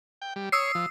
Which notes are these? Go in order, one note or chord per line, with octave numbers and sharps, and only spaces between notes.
G5
G3
C#5 D#6 E6 C7
F3